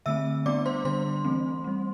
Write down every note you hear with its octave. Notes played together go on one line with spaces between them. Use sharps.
D3 A3 C4 E5 E6
G3 B3 D4 D5 D6
C5 C6
D3 G3 B3 D4 C5 C6
E3 A3 C4
G3 C4